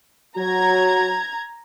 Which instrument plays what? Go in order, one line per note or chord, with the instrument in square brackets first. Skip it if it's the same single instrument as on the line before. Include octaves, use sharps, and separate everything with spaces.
[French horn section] F#3 F#4 [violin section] A#5 G#6